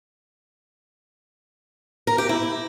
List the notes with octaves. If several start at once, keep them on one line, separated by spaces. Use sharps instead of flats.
A#4
G4
E4